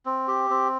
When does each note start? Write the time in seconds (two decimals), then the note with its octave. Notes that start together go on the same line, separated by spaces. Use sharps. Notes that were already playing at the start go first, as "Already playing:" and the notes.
0.06 C4
0.28 G4
0.50 C4